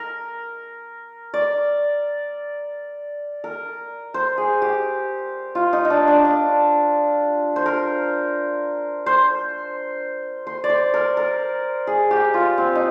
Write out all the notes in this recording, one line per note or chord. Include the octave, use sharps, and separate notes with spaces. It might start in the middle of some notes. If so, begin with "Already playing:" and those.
Already playing: A#4
D5
A#4
C5
G#4
G4
F4
D#4
D#4
D4
D4
D4
C5
A#4
C5
C5
D5
C5
A#4
A#4
G#4
G4
F4
C4
D#4